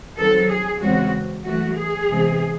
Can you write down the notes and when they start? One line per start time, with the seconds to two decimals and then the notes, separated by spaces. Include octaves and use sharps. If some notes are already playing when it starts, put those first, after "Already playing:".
0.16 D#3 F#3 C4 A4
0.48 G#4
0.80 E2 C#3 G#3 C4 F#4
1.44 F#2 E3 A3 F#4
1.75 G#4
2.07 E2 C3 E3 G#3 C4